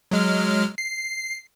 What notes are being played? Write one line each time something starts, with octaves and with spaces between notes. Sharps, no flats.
F#3 G#3 F6
C7